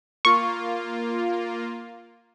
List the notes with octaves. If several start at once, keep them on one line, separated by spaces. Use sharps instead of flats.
A#3 F4 C#6